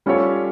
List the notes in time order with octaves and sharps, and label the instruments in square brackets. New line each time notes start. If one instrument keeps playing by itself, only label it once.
[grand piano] G3 C#4 F4 A4 C#5